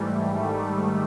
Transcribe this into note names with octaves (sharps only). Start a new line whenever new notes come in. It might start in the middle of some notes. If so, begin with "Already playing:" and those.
Already playing: G#2 E3 G3 A3
G#2 D#3 G3 A3